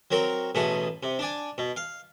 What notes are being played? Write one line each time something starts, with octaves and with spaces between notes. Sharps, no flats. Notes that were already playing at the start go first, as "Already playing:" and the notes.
F#3 C4 A#4 C#5
A1 B2 A3 G#4 F#5
C3
D4 D5 G#5
B2
F5